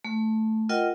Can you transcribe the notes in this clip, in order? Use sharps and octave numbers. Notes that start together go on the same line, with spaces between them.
A3
F4 A#4 D#5 F#5 G5